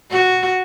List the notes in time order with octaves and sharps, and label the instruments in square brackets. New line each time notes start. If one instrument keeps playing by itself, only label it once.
[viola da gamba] F#4